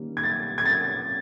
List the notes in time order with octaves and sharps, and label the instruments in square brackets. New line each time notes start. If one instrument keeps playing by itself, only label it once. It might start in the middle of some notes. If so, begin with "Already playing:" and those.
Already playing: [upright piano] D#3 G3 A#3 C#4
G#6
A6
G#6
A6